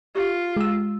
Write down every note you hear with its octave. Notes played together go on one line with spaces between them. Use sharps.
F4 G4
G#3 E6